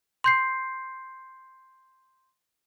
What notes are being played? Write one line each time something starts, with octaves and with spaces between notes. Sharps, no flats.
C6 G6 C7